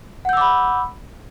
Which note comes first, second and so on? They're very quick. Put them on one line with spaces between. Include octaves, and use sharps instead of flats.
F#5 G6 E6 D6 B5